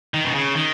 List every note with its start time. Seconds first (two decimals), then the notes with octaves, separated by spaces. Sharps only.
0.14 D#3
0.25 B2
0.34 C#3
0.55 D#3